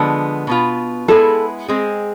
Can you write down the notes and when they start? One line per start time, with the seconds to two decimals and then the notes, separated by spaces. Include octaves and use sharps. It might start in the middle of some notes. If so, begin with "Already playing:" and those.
Already playing: D3 F3 G#3 B3
0.47 B2 B3 F4
1.08 G#3 B3 E4 G#4 A4
1.68 G#3 C4 G#4